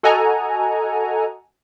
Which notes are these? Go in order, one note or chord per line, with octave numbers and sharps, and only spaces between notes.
F#4 A4 D#5 F#5 G#5 A#5